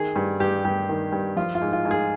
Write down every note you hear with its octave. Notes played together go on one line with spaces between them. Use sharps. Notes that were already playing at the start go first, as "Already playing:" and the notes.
Already playing: D#3 G#4
G2
G2 G4
G2 G4
D#3
G2
F3 F4
F4
G#2
F4
G#2
G#4